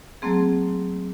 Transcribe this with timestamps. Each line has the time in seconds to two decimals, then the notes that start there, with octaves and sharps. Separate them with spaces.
0.22 F#3 A3 A#3 C4 G#4